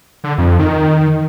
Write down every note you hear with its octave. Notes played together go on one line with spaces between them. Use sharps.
D3
F2
D#3